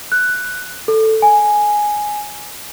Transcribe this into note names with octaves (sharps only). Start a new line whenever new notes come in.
F#6
A4
G#5